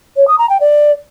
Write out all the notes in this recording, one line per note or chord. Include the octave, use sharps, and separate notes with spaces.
C#5
D#6
A#5
G5
D5